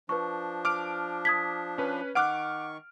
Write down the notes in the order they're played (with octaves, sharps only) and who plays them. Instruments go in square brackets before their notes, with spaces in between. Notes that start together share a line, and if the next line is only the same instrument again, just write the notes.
[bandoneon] F3 D4 [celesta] B4 C#6
[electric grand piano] D6 F6 D7
[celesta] D#6 G#6 B6
[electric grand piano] C#4 B4
[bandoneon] D#3 C#6 [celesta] F#5 F#6 [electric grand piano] D6 F6 D7